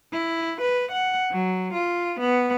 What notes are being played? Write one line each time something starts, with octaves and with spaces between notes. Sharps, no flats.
E4
B4
F#5
F#3
F4
B3